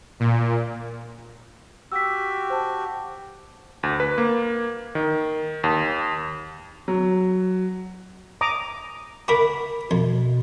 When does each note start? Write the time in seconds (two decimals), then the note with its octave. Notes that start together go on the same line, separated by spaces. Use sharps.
0.20 A#2
1.92 F#4 G4 E6 B6
2.50 C5 A5
3.83 D2
4.00 B4
4.18 A#3
4.95 D#3
5.64 D#2
6.88 F#3
8.41 A#5 D6 D#6
9.28 F#4 A#4 B5 D6
9.91 F2 B2